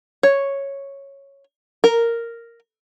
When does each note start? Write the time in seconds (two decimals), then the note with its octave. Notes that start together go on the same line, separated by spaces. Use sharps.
0.23 C#5
1.84 A#4